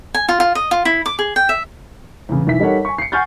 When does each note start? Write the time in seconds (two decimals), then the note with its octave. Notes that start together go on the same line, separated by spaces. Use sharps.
0.14 G#5
0.29 F4
0.40 F4
0.55 D#5
0.71 F4
0.85 E4
1.06 D6
1.19 G#4
1.36 G5
1.49 E5
2.29 E2 A2 C#3
2.47 B1 E3 E5 B6
2.60 G3 D#4 A4 A#4 C#5 F#5
2.85 G#5 C#6
2.98 C7 C#7
3.12 F#5 G#5 C#6 F6 G6 A6